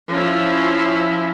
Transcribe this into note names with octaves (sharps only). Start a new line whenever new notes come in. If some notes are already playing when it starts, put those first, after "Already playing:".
F3 C#4 E4